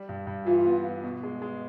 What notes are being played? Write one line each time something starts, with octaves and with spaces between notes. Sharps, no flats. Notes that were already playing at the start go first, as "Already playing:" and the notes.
Already playing: G3
G2
G2
E3 F4
B3
B3
B2
G#3
G#3